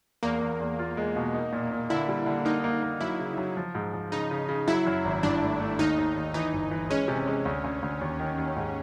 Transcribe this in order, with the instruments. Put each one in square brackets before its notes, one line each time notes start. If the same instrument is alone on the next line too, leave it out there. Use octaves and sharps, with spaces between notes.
[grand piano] E2 [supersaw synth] A#3
[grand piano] E2
E2
F4
G#3
B2
D#4
A#2
A#2
[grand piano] D3 [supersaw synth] E4
[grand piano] G3
D3
[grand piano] A#3 [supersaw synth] D#4
[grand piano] A#3
A#3
[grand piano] F#3 [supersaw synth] E4
[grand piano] C#3
F#3
F3
G#2
F3
[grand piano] C#3 [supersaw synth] D#4
[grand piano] C#3
C#3
[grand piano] F#3 [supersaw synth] E4
[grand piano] F#2
G#1
[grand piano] G2 [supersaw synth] D4
[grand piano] A3
A3
[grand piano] D#2 [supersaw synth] D#4
[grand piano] D#2
D#2
[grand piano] E3 [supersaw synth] D#4
[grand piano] G1
E3
[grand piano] G#3 [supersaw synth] C#4
[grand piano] C3
G#3
D2
D2
D2
D#2
D#3
D#2
G#2